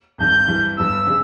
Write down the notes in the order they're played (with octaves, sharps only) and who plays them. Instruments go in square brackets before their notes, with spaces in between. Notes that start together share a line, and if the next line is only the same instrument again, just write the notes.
[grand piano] G#1 G2 D#3 [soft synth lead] G6
[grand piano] G2 E3 G3
[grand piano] G1 G2 G3 B3 [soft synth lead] E6
[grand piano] C#3 G3 B3